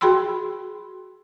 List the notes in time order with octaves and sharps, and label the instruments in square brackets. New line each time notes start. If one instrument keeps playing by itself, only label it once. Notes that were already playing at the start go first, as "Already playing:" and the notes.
[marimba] F#4 G#4 G5 B5 C6 E6